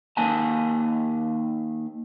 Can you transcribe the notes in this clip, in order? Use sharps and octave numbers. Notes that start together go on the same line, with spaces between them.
D#3 A#3 G#5 A5